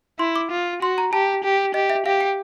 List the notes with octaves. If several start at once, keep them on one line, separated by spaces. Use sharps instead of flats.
E4 C6
D6
F4
F#4 C6
A#5
G4 A5
G4
G4 D#5
E5
G4 F5
G5